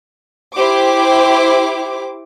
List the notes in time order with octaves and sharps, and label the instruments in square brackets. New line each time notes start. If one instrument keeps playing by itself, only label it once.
[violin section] E4 G4 C5 D6